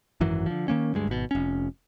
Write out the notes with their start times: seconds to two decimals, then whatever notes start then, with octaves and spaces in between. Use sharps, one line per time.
0.21 G#1 F#2 E3 F#3
0.46 D3 F3
0.68 D#3 A#3 C#4
0.94 D2 G2 G#3
1.07 G#1 B2
1.31 F1 C#4